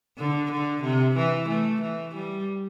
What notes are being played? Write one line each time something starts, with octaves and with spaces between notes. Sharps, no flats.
D3
D3
C3
E3
A3
E3
G3